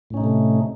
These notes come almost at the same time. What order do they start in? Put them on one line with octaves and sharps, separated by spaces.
A2 C#4 D#4 C3 A3